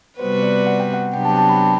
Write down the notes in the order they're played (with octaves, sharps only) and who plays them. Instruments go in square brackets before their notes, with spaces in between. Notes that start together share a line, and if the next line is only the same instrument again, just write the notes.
[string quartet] C3 G3 B3 F#4 B4 [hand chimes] C5
[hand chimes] D5
F#5
G5
F#5
[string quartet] C3 F#3 B3 D4 G4 [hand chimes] G5
[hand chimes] A5
A5
B5